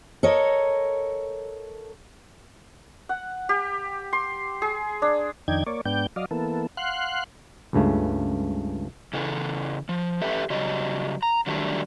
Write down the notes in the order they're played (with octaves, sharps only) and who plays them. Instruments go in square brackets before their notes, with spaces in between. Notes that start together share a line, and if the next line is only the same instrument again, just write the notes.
[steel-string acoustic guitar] A4 A#4 C#5 D#5
[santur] F#5
G4
C6
G#4
D4
[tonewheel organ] F2 D#3 D4 D#4 G5 G#6
A#3 C#5 D5
G#2 B3 D4 G5 G6
F#3 D5 D#5 F5
E3 A#3 B3 A4
F5 F#5 C6 F#6
[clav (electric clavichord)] C#2 G2 C#3 A3
[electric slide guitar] C#3 E3 A4
F3
G4 A4 B4 E5
C#3 F#3 G3 D#5
A#5
D3 D#3 F#3 G3 A3 D4